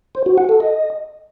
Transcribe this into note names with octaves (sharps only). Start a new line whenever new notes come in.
C5
F#4
F#5
A4
D#5